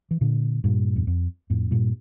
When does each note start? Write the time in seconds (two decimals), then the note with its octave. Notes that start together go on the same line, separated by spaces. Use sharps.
0.11 E3
0.21 A#2 D3
0.64 G2 A#2
0.96 E2
1.07 F2
1.50 F2 A2
1.71 G2 A#2